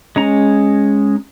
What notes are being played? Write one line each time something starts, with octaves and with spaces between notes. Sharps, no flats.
G#3 C#4 A#5